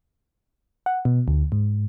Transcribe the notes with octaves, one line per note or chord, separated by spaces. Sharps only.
F#5
B2
D2
G#2